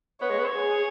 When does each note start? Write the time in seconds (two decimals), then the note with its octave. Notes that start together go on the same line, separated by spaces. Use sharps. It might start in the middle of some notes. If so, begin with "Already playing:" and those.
0.21 B3 C#5
0.30 G#3
0.39 B3
0.46 C#5
0.55 G#4